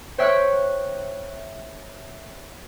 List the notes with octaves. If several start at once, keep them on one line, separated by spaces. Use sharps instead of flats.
C5 C#5 E5 G5 E6 F#6